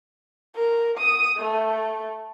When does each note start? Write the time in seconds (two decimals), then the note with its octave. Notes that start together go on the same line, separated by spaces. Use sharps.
0.56 A#4
0.98 D#6
1.37 A3